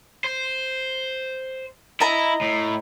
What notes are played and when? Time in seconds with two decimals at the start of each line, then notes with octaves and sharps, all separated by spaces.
0.24 C5
2.00 E4 D#5 A#5
2.41 A2